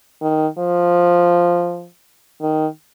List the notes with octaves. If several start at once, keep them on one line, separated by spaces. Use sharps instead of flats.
D#3
F3
D#3